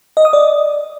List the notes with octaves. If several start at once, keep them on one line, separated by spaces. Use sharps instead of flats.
D#5
D#6
D5